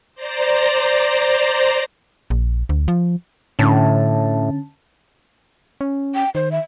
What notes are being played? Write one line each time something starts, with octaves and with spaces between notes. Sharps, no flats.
C5 D5 A#5
A#1
D2
F3
A2 D3 C#4 A5
C#4
G5
D#3 C5
E5